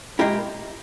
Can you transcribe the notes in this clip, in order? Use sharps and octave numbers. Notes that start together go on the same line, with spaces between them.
A#2 G#3 E4 G4 A#4